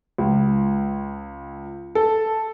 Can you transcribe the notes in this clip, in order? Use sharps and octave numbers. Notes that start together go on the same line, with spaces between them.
C#2
A4